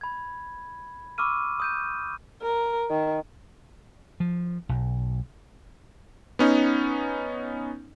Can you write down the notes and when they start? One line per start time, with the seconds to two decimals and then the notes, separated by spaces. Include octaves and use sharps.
0.01 B5 G#6
1.18 B5 C#6 D6 E6 F6 D#7
1.60 D#6 G6 D#7
2.42 A#4
2.90 D#3
4.20 F3
4.69 B1
6.39 B3 C#4 D#4